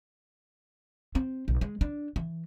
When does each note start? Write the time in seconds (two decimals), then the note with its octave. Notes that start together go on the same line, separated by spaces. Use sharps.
1.15 C4
1.48 B1
1.61 G#3
1.81 D4
2.16 E3